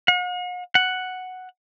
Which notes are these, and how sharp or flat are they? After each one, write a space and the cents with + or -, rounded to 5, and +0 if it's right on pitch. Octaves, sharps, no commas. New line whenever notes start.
F#5 -45
F#5 +0